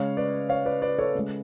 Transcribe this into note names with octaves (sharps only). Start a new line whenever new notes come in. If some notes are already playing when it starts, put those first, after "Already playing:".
Already playing: C#3 G#3 C#5 F5
B4 D5
C#5 F5
B4 D5
B4 D5
A4 C#5
C#3 G#3